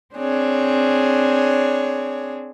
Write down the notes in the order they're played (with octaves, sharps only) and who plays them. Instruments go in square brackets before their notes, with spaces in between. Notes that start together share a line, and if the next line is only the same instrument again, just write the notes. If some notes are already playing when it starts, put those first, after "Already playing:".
[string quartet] C4 D4 G#4 C#5